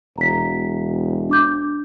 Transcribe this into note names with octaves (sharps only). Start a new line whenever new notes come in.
E1 A#5 B6
D4 D6 G6